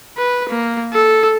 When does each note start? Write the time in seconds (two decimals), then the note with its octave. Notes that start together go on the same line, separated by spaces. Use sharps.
0.17 B4
0.49 A#3
0.93 A4